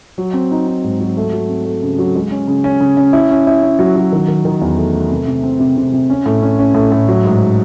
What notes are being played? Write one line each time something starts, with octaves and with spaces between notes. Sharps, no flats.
F#3
C4
D#4
D#4
G#2
F#3
A3
F#3
C4
A3
C#3
F#3
G#3
C#4
C#3
C#4
C#3
C#4
E4
C#4
E4
C#4
F#3
F#3
D#3
D#3
D#3
E2
A3
A3
C3
C3
C4
C3
C3
C3
C#4
A2
C#4
C#4
A2
A2
F#3
G#2